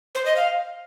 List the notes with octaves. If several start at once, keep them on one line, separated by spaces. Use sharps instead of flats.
C5
D#5
F5